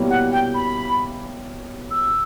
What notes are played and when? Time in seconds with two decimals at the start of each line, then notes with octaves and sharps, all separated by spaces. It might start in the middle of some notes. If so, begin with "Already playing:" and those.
Already playing: B2 G3 A#3 C#4 E4
0.10 F#5
0.32 G5
0.54 B5
1.91 E6